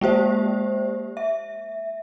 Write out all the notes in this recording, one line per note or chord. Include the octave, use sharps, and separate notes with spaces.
G#3 A#3 G4 C5
E5